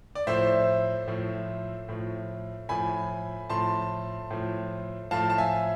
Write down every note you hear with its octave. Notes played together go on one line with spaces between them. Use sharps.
D5
A2 F3 C5 E5
A2 F3
A2 F3
A2 F3 G#5 B5
A2 F3 A5 C6
A2 F3
A2 F3 F5 A5
A5
E5 G#5